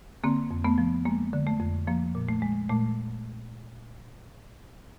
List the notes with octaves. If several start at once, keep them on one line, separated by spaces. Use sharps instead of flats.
D3 A#3 C4
F2
A3 B3
F3
G#3 A#3
D3
A3
F2
F3 A#3
A#2
A3
G#3
A#2 A3